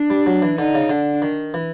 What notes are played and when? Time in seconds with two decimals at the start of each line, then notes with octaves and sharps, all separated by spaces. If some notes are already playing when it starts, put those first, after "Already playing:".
Already playing: D4
0.10 G3
0.26 F#3
0.42 E3
0.58 D3 D#4
0.75 C#3
0.89 D3 D4
1.22 D#3
1.54 E3